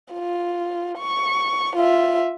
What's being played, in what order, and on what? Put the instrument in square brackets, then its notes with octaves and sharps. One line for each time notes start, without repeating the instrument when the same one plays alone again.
[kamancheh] F4
C#6
F4 E5